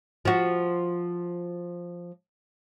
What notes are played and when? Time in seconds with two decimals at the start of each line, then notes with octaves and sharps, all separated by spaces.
0.25 F3 F#4